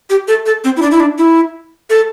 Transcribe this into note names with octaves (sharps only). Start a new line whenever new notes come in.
G4
A4
A4
C4
E4
D4
E4
D4
E4
A4